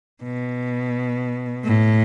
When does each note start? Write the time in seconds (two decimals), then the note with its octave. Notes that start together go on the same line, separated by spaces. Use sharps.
0.24 B2
1.64 A2